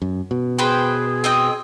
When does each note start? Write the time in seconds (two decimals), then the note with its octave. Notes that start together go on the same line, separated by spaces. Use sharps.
0.02 F#2
0.31 B2
0.58 G#4 B4 C5 G5
1.24 C4 D#5 G5